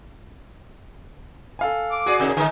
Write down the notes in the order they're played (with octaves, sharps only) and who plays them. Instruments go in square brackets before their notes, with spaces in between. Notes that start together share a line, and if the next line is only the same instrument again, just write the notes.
[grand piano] A4 F5 G#5
[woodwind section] D6
[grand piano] F#4 D5 [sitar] G#4
[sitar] C3 A#3 D#4 [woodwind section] G#4
[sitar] D3 G#3 [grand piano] G#5